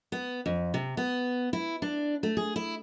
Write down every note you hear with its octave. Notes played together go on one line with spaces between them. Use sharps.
B3
F2
C3
B3
E4
D4
A3
G#4
E4